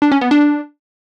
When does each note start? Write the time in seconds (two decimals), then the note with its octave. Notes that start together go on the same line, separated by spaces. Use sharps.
0.02 D4
0.12 C#4
0.21 B3
0.31 D4